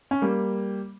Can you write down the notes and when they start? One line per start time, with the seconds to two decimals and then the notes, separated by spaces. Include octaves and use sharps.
0.11 C#4
0.22 G3 A#3